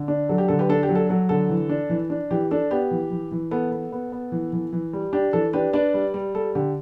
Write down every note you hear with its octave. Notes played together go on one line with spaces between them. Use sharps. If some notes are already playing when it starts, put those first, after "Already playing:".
Already playing: D3
D4
F#3 A4
G4
D3 A4
G4 B4
D4 A4
G4
F#3
A4
F#3 A4
D3 A4
E3
D4
E3
D4
E3 G4
D4 A4
B3 G4
E3
E3
E3
B3 A4
B3
B3
B3
E3
E3
E3
G3
D4 G4
E3 A4
D4 G4 B4
D4 B4 D5
G3
G3
G3 A4
D3 G4